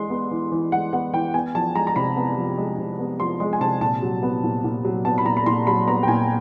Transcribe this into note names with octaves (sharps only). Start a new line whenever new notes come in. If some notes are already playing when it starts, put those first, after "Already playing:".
Already playing: E3 G#3 C6
B3
E3
E3
G#3 F#5
B3 F#5
E3 G5
B3 G#5
F3 A5
G#3 A#5
A#5
C3 B5
B3
F3
G#3
C3
B3
F3 C6
G#3 C6
G#5
C3 A5
A#2 A5
F#3
B3
A#2
A#2
F#3
B3 A5
B5
A#2 A#5
B5
A#2 C6
F#3 B5
B3 A#5
G5
A#2 G#5